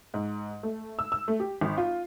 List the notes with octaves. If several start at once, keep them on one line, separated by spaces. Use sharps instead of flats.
G#2
A3
E6
E6
A3
G4
G#1
F4